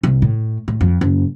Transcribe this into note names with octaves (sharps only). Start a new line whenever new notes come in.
C2
A2
A2
F2
F#1